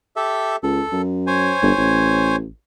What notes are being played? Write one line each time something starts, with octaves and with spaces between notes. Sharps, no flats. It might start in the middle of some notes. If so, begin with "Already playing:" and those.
G4 A4 E5
C#2 A4
F#2
C5 C#5 G#5
G1
A1